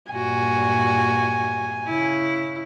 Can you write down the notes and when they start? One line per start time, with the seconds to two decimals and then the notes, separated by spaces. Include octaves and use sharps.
0.12 G2 A#2 F#4 G#5
1.87 C#3 E4